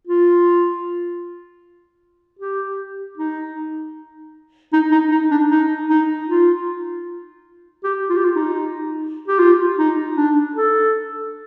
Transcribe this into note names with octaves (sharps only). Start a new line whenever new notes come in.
F4
G4
D#4
D#4
D#4
D#4
D4
D#4
D#4
F4
G4
F4
G4
F4
D#4
G4
F4
D#4
D4
A4